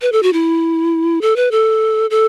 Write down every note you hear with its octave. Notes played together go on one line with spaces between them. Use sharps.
B4
A4
F#4
E4
A4
B4
A4
A4